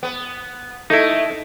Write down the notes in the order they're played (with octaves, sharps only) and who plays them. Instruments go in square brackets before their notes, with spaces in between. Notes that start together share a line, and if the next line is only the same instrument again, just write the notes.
[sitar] B3
[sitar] A3 [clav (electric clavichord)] D#4 E4